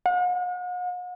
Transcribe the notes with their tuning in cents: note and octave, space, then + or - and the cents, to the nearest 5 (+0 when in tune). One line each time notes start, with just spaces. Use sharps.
F#5 -45